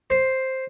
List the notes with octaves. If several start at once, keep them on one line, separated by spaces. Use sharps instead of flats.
C5